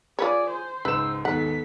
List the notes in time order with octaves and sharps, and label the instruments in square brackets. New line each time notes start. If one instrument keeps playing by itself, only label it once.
[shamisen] F4 B4 C#5 [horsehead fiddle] G#4 D5
[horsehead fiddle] C5
[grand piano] C#2 G#2 E7 [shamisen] B4 [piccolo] E6
[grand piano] D#2 G#2 [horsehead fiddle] B3 A4 [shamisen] F#5 [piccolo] B6